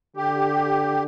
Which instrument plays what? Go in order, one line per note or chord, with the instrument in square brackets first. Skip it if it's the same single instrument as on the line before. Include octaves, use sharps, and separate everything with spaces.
[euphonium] D3 [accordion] G4